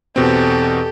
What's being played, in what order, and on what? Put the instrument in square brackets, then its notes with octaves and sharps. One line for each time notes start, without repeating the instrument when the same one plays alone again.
[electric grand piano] E2 B2 C4 [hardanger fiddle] G4 A4